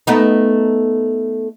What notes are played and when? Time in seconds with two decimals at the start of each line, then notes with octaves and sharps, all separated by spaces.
0.07 A3 B3 D#4